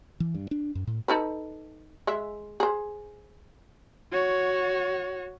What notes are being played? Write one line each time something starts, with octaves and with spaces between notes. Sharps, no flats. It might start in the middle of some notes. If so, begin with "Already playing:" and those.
E3
G2
D4
F#2
A2
D#4 A4 B4
G#3 E5
G#4 C5
F#4 C#5